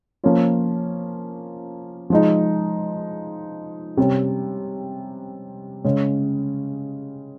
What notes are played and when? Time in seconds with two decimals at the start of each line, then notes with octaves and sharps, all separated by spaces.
0.24 F3 A#3 C#4 F4
2.10 F3 G#3 D#4
3.97 C3 G3 C#4
5.84 C#3 G#3 C#4